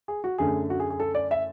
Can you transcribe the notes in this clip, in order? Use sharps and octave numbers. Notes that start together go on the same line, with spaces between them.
G#4
F#4
F#2 D3 A3 G#4
F#4
G#4
G#4
A4
D5
E5